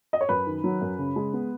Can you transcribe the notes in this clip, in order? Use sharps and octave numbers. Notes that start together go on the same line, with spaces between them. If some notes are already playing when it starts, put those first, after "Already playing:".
D#5
C#5
F#2 B4
D#3
F#3
F#2
C#3
G#3
B3